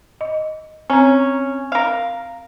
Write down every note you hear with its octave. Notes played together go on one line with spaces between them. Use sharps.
D#5
C4 C#4 A#5
A#4 F5